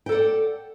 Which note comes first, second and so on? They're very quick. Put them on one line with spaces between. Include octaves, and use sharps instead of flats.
G5 A4 F#5 D5